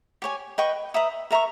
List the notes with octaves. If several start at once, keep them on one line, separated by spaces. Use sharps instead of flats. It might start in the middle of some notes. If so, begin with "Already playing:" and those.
G4 C#5 G#5
B4 D#5 G5 C#6
B4 E5 A#5 D#6
A#4 E5 A#5 C#6